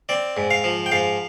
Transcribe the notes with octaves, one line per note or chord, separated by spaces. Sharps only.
C4 D5
G#2
F5
F3
G5
G#2 F5